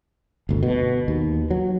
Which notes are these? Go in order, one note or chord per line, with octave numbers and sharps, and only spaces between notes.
G1 D2
B2
D#2
F#3